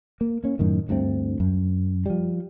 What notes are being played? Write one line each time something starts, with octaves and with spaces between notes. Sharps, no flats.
A#3
A#3 C#4
F#2 A2 D#3
D2 G2 A3 C4
F#2
F3 G3